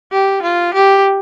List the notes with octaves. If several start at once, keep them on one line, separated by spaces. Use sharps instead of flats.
G4
F4
G4